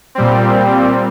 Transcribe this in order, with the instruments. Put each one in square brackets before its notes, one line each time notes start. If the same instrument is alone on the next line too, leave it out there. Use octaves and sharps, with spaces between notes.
[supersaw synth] A#2 G3 C4